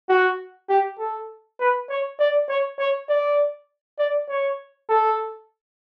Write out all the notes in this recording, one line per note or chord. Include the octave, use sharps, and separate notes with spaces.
F#4
G4
A4
B4
C#5
D5
C#5
C#5
D5
D5
C#5
A4